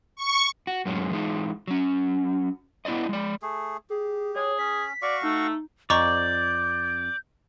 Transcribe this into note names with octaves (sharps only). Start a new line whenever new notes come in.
C#6
F#4
F#2 A2 F#3 G#3 C#4
E3 G#3 D#4
F#3 C#4
B3 E4 F4 D5 D#5
G#3 D5
A3 G#4
G4 G#4
G#4 C#5
C#4 B6
F#4 D5 F5 C#6
A3 D#4
F2 D5 D#5 A#5 C#6 G6